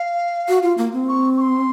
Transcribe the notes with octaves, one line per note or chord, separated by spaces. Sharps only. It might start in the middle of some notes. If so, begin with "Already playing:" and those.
Already playing: F5
F#4
F4
A#3
C4
C#6
C#6
C6